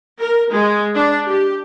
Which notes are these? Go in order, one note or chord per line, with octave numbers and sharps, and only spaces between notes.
A#4
G#3
D4
G4